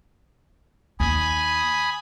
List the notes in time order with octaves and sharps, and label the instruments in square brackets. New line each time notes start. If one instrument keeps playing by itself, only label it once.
[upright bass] D#2 [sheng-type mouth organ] G#5 B5 D#6